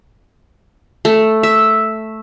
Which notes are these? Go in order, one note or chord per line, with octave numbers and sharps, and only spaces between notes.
A3
E5